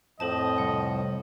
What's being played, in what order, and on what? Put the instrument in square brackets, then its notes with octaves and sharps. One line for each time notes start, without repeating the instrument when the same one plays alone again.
[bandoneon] F2 A2 F3 [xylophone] A4 C5 A5 [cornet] D#5
[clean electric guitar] C2 [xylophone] F#5